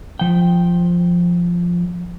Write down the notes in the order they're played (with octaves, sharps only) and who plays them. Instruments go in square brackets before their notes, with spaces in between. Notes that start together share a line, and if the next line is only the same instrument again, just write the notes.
[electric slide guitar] F3 G5